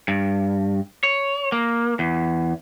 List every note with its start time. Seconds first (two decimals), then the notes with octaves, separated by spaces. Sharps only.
0.08 G2
1.03 C#5
1.52 A#3
1.99 E2